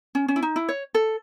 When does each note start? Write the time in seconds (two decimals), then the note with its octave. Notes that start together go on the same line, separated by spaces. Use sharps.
0.15 C#4
0.28 C#4
0.36 E4
0.42 D#4
0.56 E4
0.69 C#5
0.95 A4